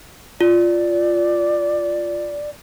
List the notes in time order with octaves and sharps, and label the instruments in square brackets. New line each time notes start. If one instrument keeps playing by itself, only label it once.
[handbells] F4 [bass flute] D5